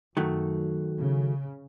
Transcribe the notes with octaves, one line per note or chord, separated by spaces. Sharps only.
F#2 D#3 F#3 A3
C#3